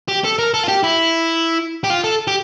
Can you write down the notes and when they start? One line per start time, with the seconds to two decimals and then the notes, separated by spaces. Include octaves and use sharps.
0.08 G4
0.24 A4
0.39 A#4
0.54 A4
0.64 F4
0.68 G4
0.83 E4
1.84 G4
1.90 F4
2.04 A4
2.28 G4